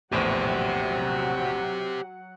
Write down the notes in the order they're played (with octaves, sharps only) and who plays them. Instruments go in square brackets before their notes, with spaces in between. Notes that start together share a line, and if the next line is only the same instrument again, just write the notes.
[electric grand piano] A#1 E2 A2 [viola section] F#3 F#5 [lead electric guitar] G4 C5